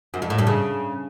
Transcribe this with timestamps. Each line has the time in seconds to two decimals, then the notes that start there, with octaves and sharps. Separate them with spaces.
0.14 F#2
0.22 F2
0.30 A2
0.38 G2
0.47 C#3